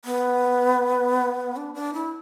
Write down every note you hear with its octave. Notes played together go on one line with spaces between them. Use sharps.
B3
D4
D4
E4